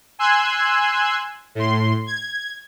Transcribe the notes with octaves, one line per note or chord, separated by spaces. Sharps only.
G#5 C6 E6 F#6 G#6
A2 C6
G#6